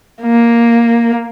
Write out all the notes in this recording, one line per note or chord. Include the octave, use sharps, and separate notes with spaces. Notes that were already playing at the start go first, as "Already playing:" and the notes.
A#3